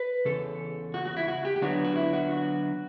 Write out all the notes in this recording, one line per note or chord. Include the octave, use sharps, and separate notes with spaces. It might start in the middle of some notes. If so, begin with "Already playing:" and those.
Already playing: B4
E2 C#3 A4
F#4
F#4
E4
F#4
G4
G4
D3 F#3 B3 D4 F#4
F#4
E4
F#4
F#4